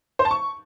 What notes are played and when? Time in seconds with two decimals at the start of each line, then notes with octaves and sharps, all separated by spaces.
0.19 C5
0.25 A5
0.31 C#6